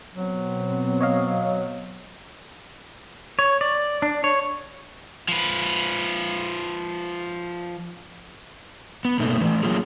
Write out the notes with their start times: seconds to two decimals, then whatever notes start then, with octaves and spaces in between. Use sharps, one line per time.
0.15 B2 F#3 B3 C4
1.01 C#5 D#5 F5
3.39 C#5
3.61 D5
4.02 D4
4.24 C#5
5.28 F3 B4
9.05 B3
9.19 B2 A3 A#3 D#4
9.37 E3 A3
9.63 F#3 A3 A#3 C#4 F4 G#4